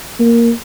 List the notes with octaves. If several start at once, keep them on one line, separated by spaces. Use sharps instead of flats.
A#3